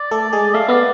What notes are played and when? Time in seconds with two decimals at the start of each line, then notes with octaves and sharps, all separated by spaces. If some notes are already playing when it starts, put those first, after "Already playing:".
Already playing: D5
0.11 A3 A4
0.33 G#3 G#4
0.54 A3 F5
0.68 B3 D5